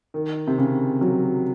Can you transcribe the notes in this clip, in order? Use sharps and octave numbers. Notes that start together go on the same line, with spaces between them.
D#3
C3
C#3
F#3